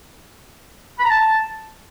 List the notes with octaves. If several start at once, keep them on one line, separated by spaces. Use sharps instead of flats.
B5
A#5
A5